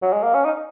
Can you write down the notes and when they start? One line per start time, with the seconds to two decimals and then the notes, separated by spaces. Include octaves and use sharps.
0.02 F#3
0.13 G#3
0.23 A#3
0.34 C#4
0.45 D#4